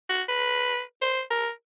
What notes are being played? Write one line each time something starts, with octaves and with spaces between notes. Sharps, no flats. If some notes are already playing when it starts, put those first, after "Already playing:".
F#4
B4
C5
A#4